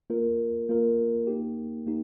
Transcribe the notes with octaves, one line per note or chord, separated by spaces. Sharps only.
A#3 F4 A#4
A#3 F4 A#4
A#3 D#4 G4
A#3 D#4 G4